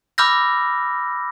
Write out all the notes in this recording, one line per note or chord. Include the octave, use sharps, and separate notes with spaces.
B5 D6 E6 F6 G6 A#6